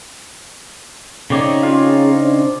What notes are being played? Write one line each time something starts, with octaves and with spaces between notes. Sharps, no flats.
C#3 C4 D#4 C#5 D5
C#4 F4 G#4 C#5
D4 C5